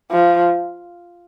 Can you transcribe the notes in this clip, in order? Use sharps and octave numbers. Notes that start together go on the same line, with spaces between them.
F3